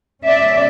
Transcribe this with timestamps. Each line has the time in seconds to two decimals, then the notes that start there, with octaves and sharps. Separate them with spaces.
0.24 B2 G#3 C#4 D5 E5